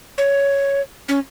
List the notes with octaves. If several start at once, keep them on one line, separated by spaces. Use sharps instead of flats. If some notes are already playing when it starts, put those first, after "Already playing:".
C#5
C#4